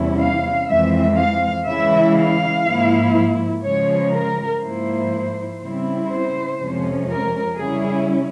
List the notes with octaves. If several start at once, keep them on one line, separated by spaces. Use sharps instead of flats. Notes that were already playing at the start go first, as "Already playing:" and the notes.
Already playing: E2 C3 G3 C#4 E4
F5
F2 E3 G#3 C4 E5
F5
C#3 E3 G#3 E4 E5
F5
G#2 F3 A#3 E4
C#3 F3 G#3 C#5
A#4
G#2 F3 A#3 E4 C5
C#3 G3 C4 E4
C5
F2 C3 F3 G#3 C#4
A#4
C#3 G3 C#4 E4 G#4